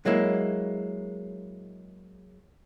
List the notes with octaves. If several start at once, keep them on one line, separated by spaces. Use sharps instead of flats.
F#3 G#3 A#3 E4